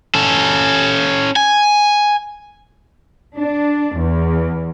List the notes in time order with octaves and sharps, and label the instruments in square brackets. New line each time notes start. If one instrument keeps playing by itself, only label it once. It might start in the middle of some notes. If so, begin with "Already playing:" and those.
[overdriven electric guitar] C#4 A4
G#5
[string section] D4
E2